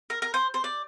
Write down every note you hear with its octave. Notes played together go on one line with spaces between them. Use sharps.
A#4
A#4
C5
C5
D5